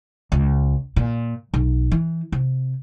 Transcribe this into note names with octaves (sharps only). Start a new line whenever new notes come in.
C#2
A#2
B1
E3
C3